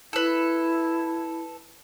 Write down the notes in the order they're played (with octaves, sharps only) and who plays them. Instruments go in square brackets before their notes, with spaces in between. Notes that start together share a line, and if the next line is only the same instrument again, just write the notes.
[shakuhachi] E4 [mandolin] A4 B4